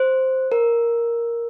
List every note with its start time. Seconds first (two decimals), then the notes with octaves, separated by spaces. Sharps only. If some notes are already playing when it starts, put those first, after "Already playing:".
Already playing: C5
0.52 A#4